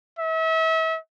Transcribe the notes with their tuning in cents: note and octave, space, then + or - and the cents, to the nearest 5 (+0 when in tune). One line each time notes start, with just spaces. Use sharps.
E5 -35